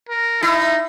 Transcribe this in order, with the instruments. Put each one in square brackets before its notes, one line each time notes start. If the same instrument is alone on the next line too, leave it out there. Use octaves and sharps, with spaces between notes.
[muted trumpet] A#4
[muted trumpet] D#4 [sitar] E4